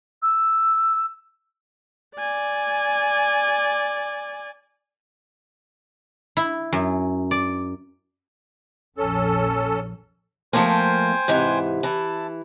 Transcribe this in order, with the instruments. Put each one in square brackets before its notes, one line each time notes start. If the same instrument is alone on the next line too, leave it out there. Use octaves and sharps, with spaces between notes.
[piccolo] E6
[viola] D5 G#5
[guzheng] E4
F#2
D5
[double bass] A#1 F2 [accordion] C#4 A4
[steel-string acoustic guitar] F3 A3 A#3 [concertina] C5 G5 G#5
[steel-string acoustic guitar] G#2 C3 E3
[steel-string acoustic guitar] E3 [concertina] E4 A5